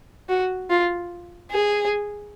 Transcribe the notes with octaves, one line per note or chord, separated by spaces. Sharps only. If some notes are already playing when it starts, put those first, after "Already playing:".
F#4
F4
G#4